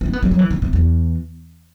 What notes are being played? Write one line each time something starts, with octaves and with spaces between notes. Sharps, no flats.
D4
C4
B3
G3
F#3
E3
D3
C3
E2